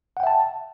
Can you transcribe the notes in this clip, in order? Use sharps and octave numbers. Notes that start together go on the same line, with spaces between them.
E5 F#5 G5 A5